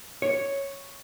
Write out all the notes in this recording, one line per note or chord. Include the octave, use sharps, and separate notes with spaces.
C#5